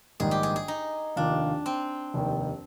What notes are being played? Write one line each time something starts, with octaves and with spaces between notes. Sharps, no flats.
A#1 G#2 D#3 G3 G#4
G4
G#4
G#4
D#4
F1 D#2 D#3 A#3 D4 F4
C4
F1 D#2 D#3